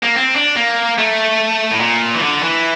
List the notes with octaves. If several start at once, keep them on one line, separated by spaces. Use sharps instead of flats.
A#3
C4
D4
A#3
A3
A2
A#2
E3
D3
E3